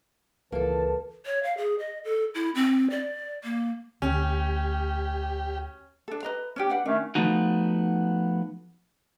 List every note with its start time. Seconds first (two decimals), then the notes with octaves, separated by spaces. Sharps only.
0.52 C#2 E3 A#3 A4 B4 A5
1.26 C#5
1.43 F5
1.57 G#4
1.79 D#5
2.04 A4
2.35 E4
2.55 C4
2.90 D5
3.44 A#3
4.02 D2 C#4 G4
6.08 D4 A4
6.23 B4 D#5 A#5
6.56 C#4 D4 G4
6.69 D4 B4 F#5
6.86 D#3 A3 C#4 D4
7.15 F3 G#3 A3 B3 D#4 F#4